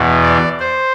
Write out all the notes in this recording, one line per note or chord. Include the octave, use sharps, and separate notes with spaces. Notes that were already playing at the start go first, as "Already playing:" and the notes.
Already playing: E2 B2
D5
C5